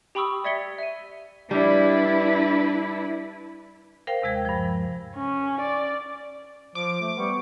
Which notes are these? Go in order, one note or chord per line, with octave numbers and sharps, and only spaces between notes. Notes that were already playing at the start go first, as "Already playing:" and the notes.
G4 G5 B5 C#6 D#6 E6
D5 E5 G#6 B6 C#7 G7
E5 D#7
G3 D4 E4 B4
A#4 C5 F5 G5
D#2 C3 G#3 G#6
G2 F3
C#4
D5
F3 D6
A3
G3 B3 C#6